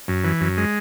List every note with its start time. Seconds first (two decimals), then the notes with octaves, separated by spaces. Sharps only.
0.08 F#2
0.24 E3
0.41 F#2
0.57 G#3